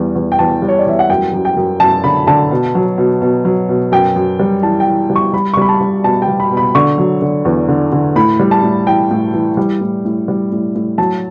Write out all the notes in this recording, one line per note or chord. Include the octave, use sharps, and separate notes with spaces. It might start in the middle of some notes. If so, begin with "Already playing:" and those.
Already playing: E2 G3
E2
G5
E2 A5
G3
C#5
D5
E2 E5
F#5
F#2 G5
F#2
G5
F#2
F#2 A5
D3 B5
D3 A5
B2
F#3
B2
B2
F#3
B2
F#2 G5
F#2
G3
E3 A5
G5
E3
G3
C#6
G3 B5
C#6
G3 B5
A5
G3
B2 A5
G5
G3
B5
B2
B5
D3 C#6
F#3
D3
E2
D3
D3
A2 B5
G3
A5
A2
E3 G5
A2
E3
G3
A2
A2
G3
A2
A2
F#3 A5